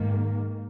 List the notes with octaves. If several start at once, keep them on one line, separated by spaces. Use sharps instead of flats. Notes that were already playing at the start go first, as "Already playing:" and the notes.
Already playing: G#2 D#3 A#3